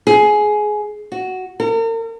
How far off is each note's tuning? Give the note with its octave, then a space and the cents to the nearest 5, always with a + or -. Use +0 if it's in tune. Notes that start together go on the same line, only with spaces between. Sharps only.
G#4 +15
F#4 +5
A#4 -40